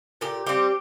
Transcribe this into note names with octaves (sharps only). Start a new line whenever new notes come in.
A#2 G4
G3 C4 G4